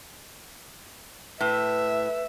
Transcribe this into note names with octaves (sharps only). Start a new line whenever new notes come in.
A2 B4 E5